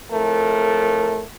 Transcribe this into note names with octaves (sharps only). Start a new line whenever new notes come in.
F2 A2 A3 A#4